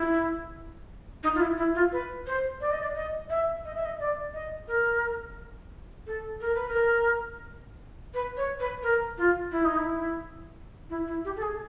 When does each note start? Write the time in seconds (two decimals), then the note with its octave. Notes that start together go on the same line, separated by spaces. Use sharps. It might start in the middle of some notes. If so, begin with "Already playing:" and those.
Already playing: E4
1.23 D#4
1.35 F4
1.40 E4
1.58 E4
1.75 F4
1.92 B4
2.27 C5
2.61 D5
2.72 D#5
2.82 D5
2.95 D#5
3.30 E5
3.65 D#5
3.75 E5
3.85 D#5
4.00 D5
4.34 D#5
4.68 A#4
6.07 A4
6.41 A#4
6.55 B4
6.69 A#4
8.14 B4
8.37 C#5
8.60 B4
8.83 A#4
9.18 F4
9.52 E4
9.65 D#4
9.77 E4
10.90 E4
11.07 E4
11.25 G4
11.36 A4
11.42 G#4